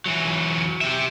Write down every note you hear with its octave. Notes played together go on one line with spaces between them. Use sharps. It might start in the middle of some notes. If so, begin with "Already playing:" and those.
E3 F#3
G4 E5